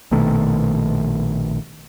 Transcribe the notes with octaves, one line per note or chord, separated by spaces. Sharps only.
A#1 B2 D#3 A3